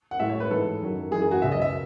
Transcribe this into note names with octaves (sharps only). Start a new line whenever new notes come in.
F#5
A2 G#3 E5
C#5
B4
G#2 E3 G#3 A4
F#2 D#3 F#3
F#2 E3 G#3 G#4
G#4
F#4
C#2 B2 F#3 E5
D#5
E5